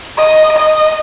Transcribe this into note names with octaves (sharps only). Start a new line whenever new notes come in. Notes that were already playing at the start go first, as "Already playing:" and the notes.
D#5
D#5